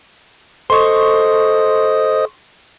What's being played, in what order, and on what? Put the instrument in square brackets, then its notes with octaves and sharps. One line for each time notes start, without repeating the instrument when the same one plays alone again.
[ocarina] A4 [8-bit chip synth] C5 D#5 D#6 [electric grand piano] C6 C#6